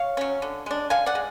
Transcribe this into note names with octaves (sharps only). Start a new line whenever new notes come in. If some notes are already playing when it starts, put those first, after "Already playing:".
Already playing: C#5 F5
F#3 C#4
D3
G#3 D4
D3 F5 G#5
D5 F#5
G#3